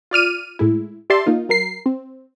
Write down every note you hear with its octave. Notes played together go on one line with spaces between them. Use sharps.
F4 D5 F6 D#7
A2 G#3 E4
G4 D5 E5 A5 C6
A#3 D#4 F4
F#3 A#4 C7
C4